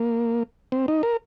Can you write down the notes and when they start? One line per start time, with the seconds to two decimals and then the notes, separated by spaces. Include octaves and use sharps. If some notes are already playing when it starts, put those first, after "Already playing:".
Already playing: A#3
0.72 C4
0.88 D#4
1.03 A#4